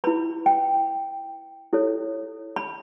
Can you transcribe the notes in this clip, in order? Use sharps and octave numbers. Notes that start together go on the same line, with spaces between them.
E4 B4 B5
G5
E4 A4 C#5
B5